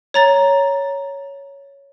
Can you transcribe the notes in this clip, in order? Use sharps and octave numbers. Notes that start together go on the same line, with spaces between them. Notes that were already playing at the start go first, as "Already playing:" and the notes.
C#5 A#5 A6